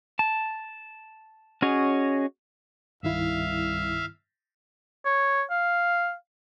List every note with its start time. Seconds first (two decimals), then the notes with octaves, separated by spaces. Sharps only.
0.19 A5
1.62 C#4 F#4 G#4 C#5 D#5
3.03 C2 G2 D#3 E4 E5 F5
5.06 C#5
5.51 F5